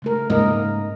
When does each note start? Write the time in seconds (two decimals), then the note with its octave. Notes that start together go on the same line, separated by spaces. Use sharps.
0.02 C#3 A3 A#4
0.30 G#2 C#3 A#3 A#4 D#5